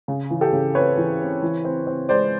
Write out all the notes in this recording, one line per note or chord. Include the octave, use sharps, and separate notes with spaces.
C#3
E3
G4 A4
C#3
C4 B4 C#5
E3
C4
E3
C4
C4
G#3 C5 D5